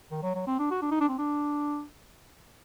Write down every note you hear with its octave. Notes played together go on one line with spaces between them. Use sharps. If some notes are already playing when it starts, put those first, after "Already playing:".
D#3
F#3
F#3
C4
D4
F#4
D4
D#4
D4
C4
D4